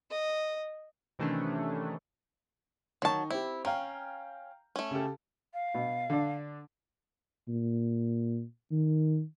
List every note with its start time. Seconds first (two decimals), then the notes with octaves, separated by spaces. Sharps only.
0.10 D#5
1.19 C3 D#3 E3 A3 C#4 D4
3.02 D#3 F#3 D#4 A5 C#6
3.30 C4 E4 G4
3.65 C#4 F5 G5 A#5
4.76 A3 C#4
4.91 C#3 G4 A4
5.54 F5
5.74 B2
6.10 D3 D4
7.48 A#2
8.71 D#3